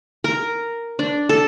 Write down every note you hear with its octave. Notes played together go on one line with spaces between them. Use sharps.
A#4
D4
A4